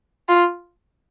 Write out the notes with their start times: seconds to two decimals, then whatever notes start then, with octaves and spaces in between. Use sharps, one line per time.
0.29 F4